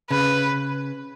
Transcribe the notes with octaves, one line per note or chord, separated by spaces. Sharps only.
C#3 B4